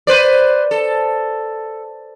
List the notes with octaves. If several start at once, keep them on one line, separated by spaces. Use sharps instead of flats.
B4 C5 D5
A4